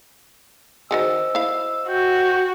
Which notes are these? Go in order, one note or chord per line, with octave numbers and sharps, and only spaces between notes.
D#3 F#4 G#4 C5 D#5 E6
E4 F5
F#4 G5